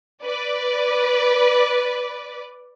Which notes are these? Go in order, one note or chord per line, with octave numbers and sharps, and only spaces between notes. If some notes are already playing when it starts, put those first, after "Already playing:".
B4 D5